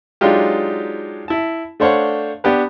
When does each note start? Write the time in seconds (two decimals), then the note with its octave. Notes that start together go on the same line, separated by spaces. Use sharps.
0.21 F#3 G#3 D4 D#4 F4 G4
1.28 E4 A5
1.80 A3 D4 C5 C#5 F5 F#5
2.44 B3 D4 G4 B4